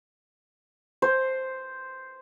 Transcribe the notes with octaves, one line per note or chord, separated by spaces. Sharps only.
C5